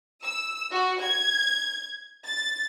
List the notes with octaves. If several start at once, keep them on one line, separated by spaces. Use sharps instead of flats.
E6
F#4
G#6
A6